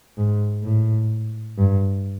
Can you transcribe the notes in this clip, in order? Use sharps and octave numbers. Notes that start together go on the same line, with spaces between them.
G#2
A2
G2